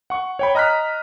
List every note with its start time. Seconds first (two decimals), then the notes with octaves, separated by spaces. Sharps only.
0.10 F#5 C#6
0.39 C#5 G5 B5
0.55 D#5 A#5 F6 F#6 B6